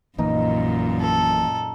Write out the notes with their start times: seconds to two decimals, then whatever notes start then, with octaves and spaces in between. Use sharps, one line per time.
0.18 A#1 F#2 A#2 E3 A#3 D#4
1.01 A4